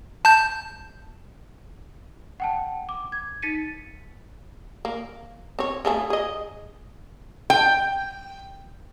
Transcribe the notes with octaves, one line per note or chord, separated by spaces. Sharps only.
A5 G6
F#5 G5 A5
D6
G#6
D#4 A6 B6 C#7 D#7
A#3
C4 C#5
C#3 A3 G#4
G#4 D#5
G5